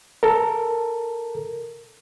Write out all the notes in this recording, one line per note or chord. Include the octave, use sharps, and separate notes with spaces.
A4 A#4